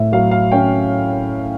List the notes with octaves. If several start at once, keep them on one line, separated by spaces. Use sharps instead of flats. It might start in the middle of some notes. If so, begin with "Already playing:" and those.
Already playing: A2 E5
F#3 F5
F5
C#4 G5